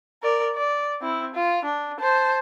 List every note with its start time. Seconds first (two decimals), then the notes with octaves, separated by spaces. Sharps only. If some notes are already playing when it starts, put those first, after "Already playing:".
0.23 A#4 D5
0.55 D5
1.01 C4 E4
1.35 F4
1.65 D4
2.00 C5 A5